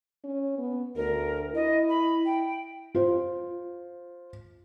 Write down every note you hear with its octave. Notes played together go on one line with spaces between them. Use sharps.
C#4
B3
D2 A#4
E4 D#5
B5
G5
F4 C5